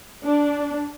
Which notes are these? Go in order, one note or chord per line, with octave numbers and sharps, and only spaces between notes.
D4